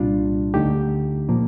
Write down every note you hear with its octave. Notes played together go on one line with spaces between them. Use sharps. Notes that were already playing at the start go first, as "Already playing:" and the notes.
Already playing: C2 A#2 G3 D4 F4
D2 D3 A3 D#4 G4
A#2 F3 A#3